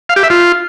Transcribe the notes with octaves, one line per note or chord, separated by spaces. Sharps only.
F5
G4
E5
F4